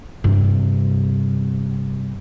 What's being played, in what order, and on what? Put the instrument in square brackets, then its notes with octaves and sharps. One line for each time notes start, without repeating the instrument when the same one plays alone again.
[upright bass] G2 C3